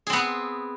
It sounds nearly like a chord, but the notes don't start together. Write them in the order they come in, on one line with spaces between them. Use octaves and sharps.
G#4 C4 B3